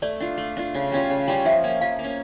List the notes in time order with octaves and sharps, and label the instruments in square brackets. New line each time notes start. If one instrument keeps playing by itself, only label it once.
[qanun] A3 [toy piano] D5
[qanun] D4 F4
A3
D4 F4
C#3
G3 C#4 F4
C#3
G3 C#4 F4
[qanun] F3 [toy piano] E5
[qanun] A#3 C#4
[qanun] F3 [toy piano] F5
[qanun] A#3
C#4